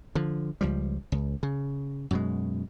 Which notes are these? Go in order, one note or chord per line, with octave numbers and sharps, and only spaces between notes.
D3 F3
C#2 F3 G3
C#2
C#3
F#2 B2 G#3